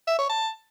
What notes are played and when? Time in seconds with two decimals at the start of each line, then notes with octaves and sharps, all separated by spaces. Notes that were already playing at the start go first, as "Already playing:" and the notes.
0.07 E5
0.18 C#5
0.29 A5